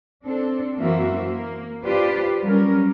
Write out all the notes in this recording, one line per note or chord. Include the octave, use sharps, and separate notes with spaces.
C4 D4 A4
F#2 E3 A#3 C4 F#4 E5
A#3
D4 F4 G4 B4 C5 D5
F#3 G3 C#4 A#4